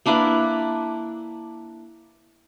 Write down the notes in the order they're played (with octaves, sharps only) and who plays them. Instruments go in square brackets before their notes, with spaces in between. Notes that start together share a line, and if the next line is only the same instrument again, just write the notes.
[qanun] A#3 D4 E4 B4